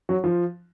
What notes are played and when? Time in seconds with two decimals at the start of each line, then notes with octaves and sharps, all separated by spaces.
0.09 F#3
0.24 F3